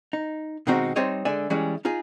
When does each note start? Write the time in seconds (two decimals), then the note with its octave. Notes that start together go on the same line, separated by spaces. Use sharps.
0.13 D#4
0.67 B2 D#3 G#3 C4 D#4 F#4
0.96 G3 C4 D#4 C5 C#5 D#5
1.25 D3 G#3 D5 E5 G#5
1.50 E3 G3 G#3 C#4
1.85 D#4 F4 G#4